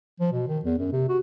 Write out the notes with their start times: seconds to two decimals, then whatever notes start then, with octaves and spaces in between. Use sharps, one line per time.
0.20 F3
0.32 B2
0.48 D#3
0.65 E2
0.78 F#2
0.92 C3
1.09 F#4